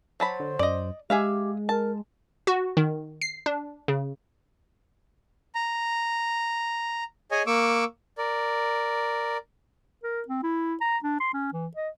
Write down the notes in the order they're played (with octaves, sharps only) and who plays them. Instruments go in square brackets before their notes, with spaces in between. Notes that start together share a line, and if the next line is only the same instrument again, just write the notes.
[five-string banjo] F#3 A5 B5 [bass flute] C5
[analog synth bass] D3
[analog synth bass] F#2 [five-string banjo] D5 D#5
[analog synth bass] G#3 [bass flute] G4 [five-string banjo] G#4 E5 F5
[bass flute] A#4 [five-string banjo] A5
[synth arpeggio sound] F#4
D#3
C7
D4
C#3
[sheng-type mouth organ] A#5
G#4 C#5 D#5 G#5
A#3 C#6 D6 E6
A#4 D5
[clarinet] A#4
C4
E4
A#5
D4
C6
C#4
E3
D#5